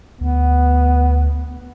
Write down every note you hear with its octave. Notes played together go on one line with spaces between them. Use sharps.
D2 B3